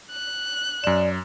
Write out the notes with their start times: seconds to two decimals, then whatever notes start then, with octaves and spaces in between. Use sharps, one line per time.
0.12 F#6
0.84 F#2 D5 E7